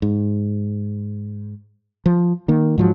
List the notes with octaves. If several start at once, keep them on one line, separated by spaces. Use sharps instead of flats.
G#2
F3
D#3 A#3
G#2 F3 F#3